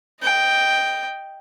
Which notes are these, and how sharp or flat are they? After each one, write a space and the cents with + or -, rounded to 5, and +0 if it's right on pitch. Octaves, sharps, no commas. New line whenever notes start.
D#5 +0 G5 +0